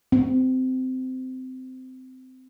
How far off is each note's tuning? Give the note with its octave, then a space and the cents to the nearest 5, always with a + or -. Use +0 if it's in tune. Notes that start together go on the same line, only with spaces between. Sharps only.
C4 -20